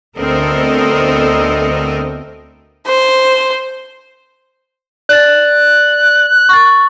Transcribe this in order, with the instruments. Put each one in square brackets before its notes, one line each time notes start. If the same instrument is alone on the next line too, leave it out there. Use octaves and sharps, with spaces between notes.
[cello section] D2 B3 C4 A4 A#4 D#5
[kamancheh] C5
[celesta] D5 A6 [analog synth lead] F#6
[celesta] C#6 A6